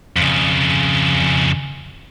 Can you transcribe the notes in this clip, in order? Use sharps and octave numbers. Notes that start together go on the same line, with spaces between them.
F2 C#3